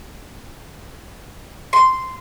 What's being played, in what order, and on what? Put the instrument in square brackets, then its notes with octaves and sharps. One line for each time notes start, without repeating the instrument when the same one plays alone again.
[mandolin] C6